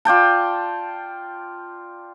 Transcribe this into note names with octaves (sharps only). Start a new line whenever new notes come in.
F4 D5 G5 A5